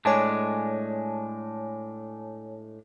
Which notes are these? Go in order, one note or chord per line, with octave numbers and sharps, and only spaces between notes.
A2 G#3 D4 C#5 G#5 A5